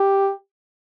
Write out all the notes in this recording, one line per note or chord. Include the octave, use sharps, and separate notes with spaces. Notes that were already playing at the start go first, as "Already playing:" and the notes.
Already playing: G4